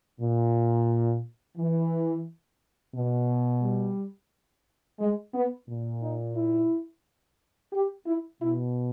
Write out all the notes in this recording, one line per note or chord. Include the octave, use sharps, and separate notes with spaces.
A#2
E3
B2
G3
G#3
B3
A#2
D#4
E4
G4
E4
B2 E4